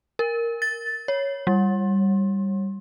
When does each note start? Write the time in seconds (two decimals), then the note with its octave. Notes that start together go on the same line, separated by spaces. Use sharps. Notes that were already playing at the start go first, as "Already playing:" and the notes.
0.19 A#4
0.62 A6
1.08 C#5
1.47 G3